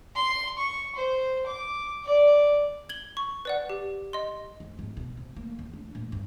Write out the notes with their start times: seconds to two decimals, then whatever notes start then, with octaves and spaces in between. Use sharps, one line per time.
0.15 C6
0.58 C#6
0.96 C5
1.46 D6
2.05 D5
2.89 G#6 F#7 G7
3.17 C#6
3.45 B4 D5 F#5
3.69 G4
4.13 D#5 C6
4.60 F2
4.79 G#1
4.97 B2
5.17 C3
5.36 A#3
5.59 E2
5.74 D4
5.95 A#2
6.12 G2